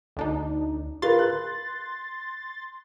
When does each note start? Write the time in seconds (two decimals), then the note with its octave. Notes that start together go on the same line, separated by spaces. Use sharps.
0.17 D2 D4 D#4
1.02 F4 A#4 B4 C6 A6
1.19 F#6